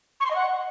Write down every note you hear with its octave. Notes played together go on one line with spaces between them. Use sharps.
C#6
C6
D#5
F#5